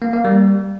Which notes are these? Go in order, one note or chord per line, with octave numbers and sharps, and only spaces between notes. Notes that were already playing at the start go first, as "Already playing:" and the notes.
A#3
A#3
G3